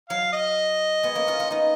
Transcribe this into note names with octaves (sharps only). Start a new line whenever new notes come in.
F#3 F5
D#5
G#3 B3
A#3 C#4
C#4 F4
C#4 F4
B3 D#4 D#5